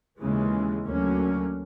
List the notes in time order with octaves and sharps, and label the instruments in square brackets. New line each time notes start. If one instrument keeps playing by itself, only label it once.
[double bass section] D#2 C#3 E3 G#3
D2 D3 F#3 A#3 C#4